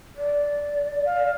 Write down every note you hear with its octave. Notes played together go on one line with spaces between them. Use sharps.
D5
F5